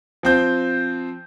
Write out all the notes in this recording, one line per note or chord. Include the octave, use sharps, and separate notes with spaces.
F3 C4 G6